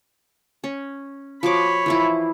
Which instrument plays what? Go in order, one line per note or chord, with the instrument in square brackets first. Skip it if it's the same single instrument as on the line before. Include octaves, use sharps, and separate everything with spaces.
[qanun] C#4
[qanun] F3 F#4 D6 [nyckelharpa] C#5 B5
[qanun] E3 F3 E4